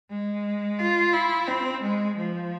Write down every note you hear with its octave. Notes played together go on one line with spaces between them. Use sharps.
G#3
F4
E4
C4
G#3
F3